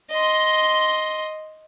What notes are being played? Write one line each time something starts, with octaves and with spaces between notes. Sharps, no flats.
D#5 C6